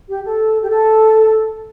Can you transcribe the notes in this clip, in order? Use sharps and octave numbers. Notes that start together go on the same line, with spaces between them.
G4
A4
G4
A4